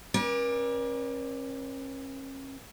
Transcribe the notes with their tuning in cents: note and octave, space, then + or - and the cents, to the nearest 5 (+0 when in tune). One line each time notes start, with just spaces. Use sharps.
C#4 -35 A#4 +45 D5 +10